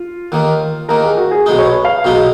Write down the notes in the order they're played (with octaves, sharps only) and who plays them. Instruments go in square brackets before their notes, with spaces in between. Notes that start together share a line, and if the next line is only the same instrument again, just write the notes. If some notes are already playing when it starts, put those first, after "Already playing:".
Already playing: [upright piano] F4
[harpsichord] D#2 D#3 A#3
[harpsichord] D#2 D#3 A#3 [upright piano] A#4
[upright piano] G#4
F#4
G#4
[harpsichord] B1 B2 G#3 D#4
[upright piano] C#5
B4
F5
[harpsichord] B1 B2 G#3 D#4 [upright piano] F#4